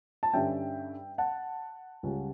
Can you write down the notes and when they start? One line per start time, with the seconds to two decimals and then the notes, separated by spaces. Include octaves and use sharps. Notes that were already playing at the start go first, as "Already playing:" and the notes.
0.23 A5
0.33 G2 D3 G3 C#4 E5 G5
1.18 F#5 A5
2.03 C#2 C#3 G3 C#4